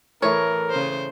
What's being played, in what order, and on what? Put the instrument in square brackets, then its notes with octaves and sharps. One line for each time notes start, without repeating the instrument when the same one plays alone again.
[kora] A2 A3 [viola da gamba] E3 [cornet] A#4 [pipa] C#5
[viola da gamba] C#3 C5